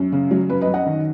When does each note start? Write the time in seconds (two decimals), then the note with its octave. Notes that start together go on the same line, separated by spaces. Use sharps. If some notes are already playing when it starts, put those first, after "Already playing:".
Already playing: F#2
0.12 C#3
0.31 F#3
0.50 F#2 B4
0.61 B4 D#5
0.68 F#2
0.74 D#5 F#5
0.86 D#3